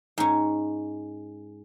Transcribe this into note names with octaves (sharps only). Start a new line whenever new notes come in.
G#2 C#4